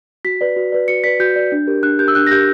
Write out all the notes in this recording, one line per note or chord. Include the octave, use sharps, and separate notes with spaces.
F#4 B6
B4 D5
F#4
B4 D5
F#4 C#7
B4 D5 B6
F#4 G6
B4 D5
D4
G4 A#4
D4 F#6
G4 A#4 G6
E6
D4 F#6
A#6
G4 A#4 G6